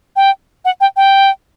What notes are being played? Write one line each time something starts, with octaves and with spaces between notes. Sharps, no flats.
G5
F#5
G5
G5